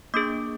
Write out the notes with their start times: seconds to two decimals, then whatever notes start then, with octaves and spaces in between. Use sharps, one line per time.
0.14 A#3 D4 G#4 D6